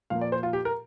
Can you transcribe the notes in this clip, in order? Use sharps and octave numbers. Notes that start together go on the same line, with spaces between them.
A#2 F3 A#3 F5
D5
C5
F4
G4
A#4